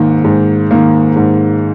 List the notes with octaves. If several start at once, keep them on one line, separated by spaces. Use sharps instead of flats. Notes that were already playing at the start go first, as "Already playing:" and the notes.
Already playing: G#2 D#3 A#3
G#2
D#3 A#3
G#2